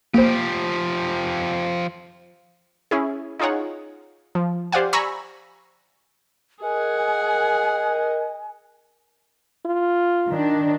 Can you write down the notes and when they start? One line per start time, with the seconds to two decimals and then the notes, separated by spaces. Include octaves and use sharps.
0.14 F3 A#3 G4 C5
2.91 C#4 E4 G#4
3.39 D#4 F4 G#4 C#5 F#5
4.35 F3
4.72 G4 C5 D5 F5 F#5 G#5
4.93 G#5 A#5 B5 C#6 E6 A#6
6.63 G#4 A#4 D#5 F#5 G#5
9.65 F4
10.29 D#3 D4